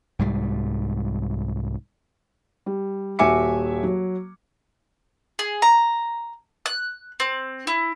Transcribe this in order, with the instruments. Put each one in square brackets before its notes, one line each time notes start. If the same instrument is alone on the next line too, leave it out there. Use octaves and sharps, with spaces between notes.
[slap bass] C2 G#2 G3
[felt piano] G3
D#1 F#4 E5 G#5 D6 C#7
F#3
[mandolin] G#4
A#5
F#6
C4
E4